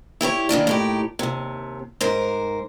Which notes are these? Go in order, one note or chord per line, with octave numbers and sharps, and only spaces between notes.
E4 G4 A#4 C#5
D#3 E3 A#3 D4
A2 D#4 G4
D#2 C3
G#2 A#4 C5